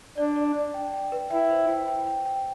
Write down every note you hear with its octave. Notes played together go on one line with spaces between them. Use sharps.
D4 D5
D5
D5
G5
G5
B4
E4 G5
C5
G5
G5
G5
G5